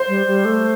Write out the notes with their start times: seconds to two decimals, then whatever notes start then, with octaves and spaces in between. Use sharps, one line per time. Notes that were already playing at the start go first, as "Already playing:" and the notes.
Already playing: C5
0.08 G3
0.27 G3
0.45 A3